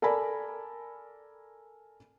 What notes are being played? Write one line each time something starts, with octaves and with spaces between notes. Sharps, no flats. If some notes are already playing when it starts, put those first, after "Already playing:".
A4 A#4 D5 G#5 B5